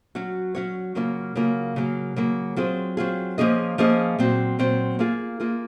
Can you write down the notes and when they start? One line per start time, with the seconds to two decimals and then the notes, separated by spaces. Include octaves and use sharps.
0.15 F#3 C#4 F#4 C#5
0.55 F#3 C#4 F#4 C#5
0.95 C#3 F#3 A#3 C#4 F4
1.36 C#3 F#3 A#3 C#4 F4
1.76 C#3 F#3 A#3
2.16 C#3 F#3 A#3
2.56 F#3 C4 F4 G#4
2.97 F#3 C4 F4 G#4
3.38 F3 A#3 C#4 G#4 D#5
3.78 F3 A#3 C#4 G#4 D#5
4.19 A#2 F#3 C4
4.59 A#2 F#3 C4
4.99 A#3 F4 G#4
5.40 A#3 F4 G#4